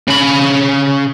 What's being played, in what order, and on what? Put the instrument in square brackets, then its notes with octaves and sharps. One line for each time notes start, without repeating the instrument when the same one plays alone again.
[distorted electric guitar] C#3 B5